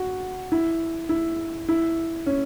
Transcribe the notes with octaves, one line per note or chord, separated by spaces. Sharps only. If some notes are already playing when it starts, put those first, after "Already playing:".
Already playing: F#4
E4
E4
E4
C#4